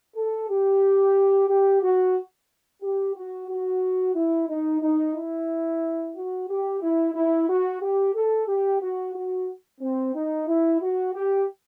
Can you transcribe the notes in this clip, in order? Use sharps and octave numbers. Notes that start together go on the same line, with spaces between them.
A4
G4
G4
F#4
G4
F#4
F#4
E4
D#4
D#4
E4
F#4
G4
E4
E4
F#4
G4
A4
G4
F#4
F#4
C4
D#4
E4
F#4
G4